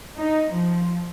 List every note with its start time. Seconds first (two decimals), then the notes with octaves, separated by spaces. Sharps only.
0.16 D#4
0.52 F3